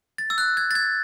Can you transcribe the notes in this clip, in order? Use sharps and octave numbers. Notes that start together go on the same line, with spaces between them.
A6
E6
F#6
G#6
A6
G#6